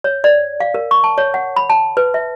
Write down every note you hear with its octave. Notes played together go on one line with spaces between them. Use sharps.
C#5
D5
F5
A#4
C#6
A5
C#5
F#5
B5
A5
B4
E5